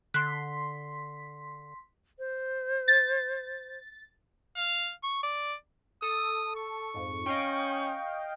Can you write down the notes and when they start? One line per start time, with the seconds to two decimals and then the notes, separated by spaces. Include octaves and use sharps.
0.14 D3 C6 F#6 B6
2.19 C5
2.88 A6
4.57 F5
5.03 C#6
5.23 D5
6.02 A4 D#6
6.56 C#6
6.94 F2 G#2
7.26 C#4 D#5 F5 G5